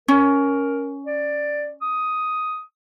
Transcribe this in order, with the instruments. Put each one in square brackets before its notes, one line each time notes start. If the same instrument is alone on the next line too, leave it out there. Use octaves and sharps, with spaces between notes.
[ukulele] C#4 [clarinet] A#4
[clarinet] D5
D#6